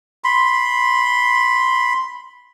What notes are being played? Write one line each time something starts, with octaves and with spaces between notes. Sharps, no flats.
B5 C6